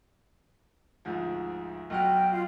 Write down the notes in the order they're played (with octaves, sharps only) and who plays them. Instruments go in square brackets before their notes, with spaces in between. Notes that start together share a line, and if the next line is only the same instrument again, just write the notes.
[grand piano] D2 G#2 F3
[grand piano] B1 F#4 F6 [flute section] G5
[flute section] F4 F5